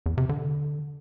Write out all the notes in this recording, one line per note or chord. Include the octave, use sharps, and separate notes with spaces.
E2
C3
D3